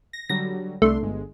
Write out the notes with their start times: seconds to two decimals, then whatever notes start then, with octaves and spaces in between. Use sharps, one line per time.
0.13 A#6
0.29 D3 F#3 G3 A#6
0.82 C2 A3 D4 C6
1.03 G1 G#3